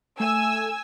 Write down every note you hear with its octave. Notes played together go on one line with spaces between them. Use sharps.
A3 G#5 E6